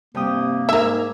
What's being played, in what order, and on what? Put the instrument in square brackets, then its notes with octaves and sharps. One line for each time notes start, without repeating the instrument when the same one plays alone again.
[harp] G2 G5 D#6 [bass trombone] C3 [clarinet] A#3
[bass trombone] G#2 [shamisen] A#4 E5 [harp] G#5